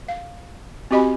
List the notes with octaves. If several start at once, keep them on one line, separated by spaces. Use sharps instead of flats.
F5
C4 F#4 G4 D#5 G#5 B5